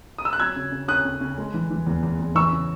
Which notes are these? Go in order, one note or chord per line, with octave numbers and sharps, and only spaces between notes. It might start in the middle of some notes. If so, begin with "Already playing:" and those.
D#6
E6
F#6
F#3 E6 G#6
C#3
C#3
C#4 D#6 F#6
C#3
C#3
G#3
E3
E3
E2
E2
E2
E3 C#6 E6
C#3